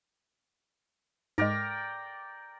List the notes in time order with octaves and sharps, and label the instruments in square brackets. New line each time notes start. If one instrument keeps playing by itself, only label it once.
[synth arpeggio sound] G#2 G#3 [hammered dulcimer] A#4 D5 G5